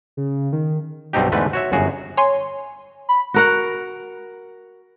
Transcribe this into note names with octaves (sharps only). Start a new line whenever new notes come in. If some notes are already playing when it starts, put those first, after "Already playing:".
C#3
D#3
B1 G2 B2 C4 D#4 G4
E2 G#2 D3 A3 B4
F#4 C#5 E5
G1 F#2 F#4 G#4
C#5 G#5 C6
B5
F#4 A#4 F#5